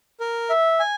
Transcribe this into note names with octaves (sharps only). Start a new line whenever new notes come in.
A#4
E5
G#5